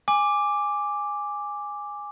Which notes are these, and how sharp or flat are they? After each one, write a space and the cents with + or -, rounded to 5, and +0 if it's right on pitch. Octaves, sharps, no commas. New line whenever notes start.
G#5 -10 D6 +0